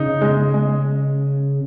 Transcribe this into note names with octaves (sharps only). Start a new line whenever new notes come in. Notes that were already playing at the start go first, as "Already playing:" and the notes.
Already playing: C#3 D#4
G#3
G#3